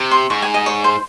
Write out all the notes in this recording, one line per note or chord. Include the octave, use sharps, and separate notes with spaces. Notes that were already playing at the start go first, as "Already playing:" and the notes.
Already playing: C3
C6
G#2 C#6
G#5
D#5
C#5
C5